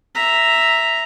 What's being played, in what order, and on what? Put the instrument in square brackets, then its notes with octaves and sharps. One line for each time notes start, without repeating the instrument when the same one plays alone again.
[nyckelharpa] E5 A#5